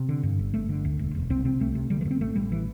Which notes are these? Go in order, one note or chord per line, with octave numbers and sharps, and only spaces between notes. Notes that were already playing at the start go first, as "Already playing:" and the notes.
Already playing: C3
D3
G2
G1
G1 A3
D3
D2
E1
E1
C2 C4
C3 C4
C2 A3
C3
D3 G3
E3
G2
C4
A1 A3
A1 G3
E3